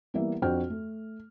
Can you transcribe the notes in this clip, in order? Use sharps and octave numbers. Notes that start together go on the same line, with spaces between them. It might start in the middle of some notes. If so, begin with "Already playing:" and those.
E3 G3 A#3 B3 E5
F2 D4 F#4 C5 G5 F6
A3